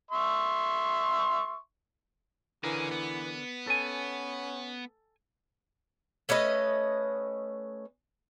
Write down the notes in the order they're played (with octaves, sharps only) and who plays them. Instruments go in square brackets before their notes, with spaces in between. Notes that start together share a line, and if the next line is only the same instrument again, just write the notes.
[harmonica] E5 C6 C#6
[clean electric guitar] D3 A#4 [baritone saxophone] E3 [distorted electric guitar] C#4 G#4
[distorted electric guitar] B3
[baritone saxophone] C#4 [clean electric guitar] A4 G#5
[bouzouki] A3 C#4 B4 D#5